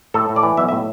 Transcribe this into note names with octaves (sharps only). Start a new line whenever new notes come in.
A2 A4
A2
D5
E3
B1 E5
A2 E5